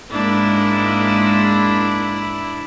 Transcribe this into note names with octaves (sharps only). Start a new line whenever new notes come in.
G#2 G#3 A#3 D4 E4